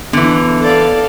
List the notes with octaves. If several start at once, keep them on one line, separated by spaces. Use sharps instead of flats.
D3 E3 B3
A4 D5 F5